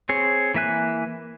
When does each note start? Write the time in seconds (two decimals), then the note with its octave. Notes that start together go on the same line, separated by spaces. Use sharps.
0.09 C4 G#4 C#5
0.54 E3 A#3 E5 G#5 F#6